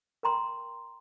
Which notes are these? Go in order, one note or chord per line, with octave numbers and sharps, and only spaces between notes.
A#4 G5 A#5 C6